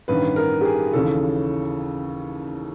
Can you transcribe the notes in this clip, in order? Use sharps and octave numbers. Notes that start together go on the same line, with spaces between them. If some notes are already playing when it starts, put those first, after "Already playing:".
A1 G2 D#3 B4
A#4
G4
G#4
D#2 C#3 E3 A4